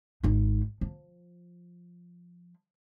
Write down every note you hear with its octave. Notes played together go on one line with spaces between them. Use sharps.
G#1 D#4
F3